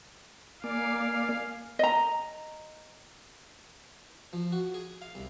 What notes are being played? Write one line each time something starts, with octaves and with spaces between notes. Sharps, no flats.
A#3 D5 F5 G#5
D#5 A#5
F3
F#4
G#4
F5
C2